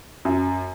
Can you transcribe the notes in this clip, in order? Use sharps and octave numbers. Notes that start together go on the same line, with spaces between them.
F#2